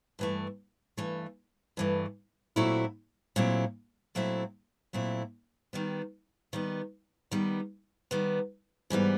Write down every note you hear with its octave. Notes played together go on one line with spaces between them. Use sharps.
G2 E3 A3
G2 E3 A3
G2 E3 A3
A#2 F#3 A3 C4 E4
A#2 F#3 A3 C4 E4
A#2 F#3 A3 C4 E4
A#2 F#3 A3 C4 E4
D#3 G3 B3
D#3 G3 B3
D#3 G3 B3
D#3 G3 B3
G#2 E3 G3 B3